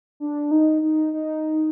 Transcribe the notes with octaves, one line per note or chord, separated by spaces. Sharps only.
D4
D#4
D#4
D#4